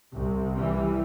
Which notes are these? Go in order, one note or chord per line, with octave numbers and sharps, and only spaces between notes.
C2 C3
E3 G3